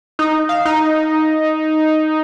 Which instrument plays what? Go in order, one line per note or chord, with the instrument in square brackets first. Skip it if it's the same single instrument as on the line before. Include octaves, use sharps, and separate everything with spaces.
[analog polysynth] D#4
F5
D#4